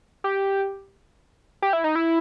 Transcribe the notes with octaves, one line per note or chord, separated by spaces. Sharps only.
G4
G4
E4
D#4
E4